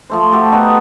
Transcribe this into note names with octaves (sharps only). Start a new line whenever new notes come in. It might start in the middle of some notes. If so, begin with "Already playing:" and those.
F3 A3 C5
A3 F#4 G4 A4
B3 D#4 A4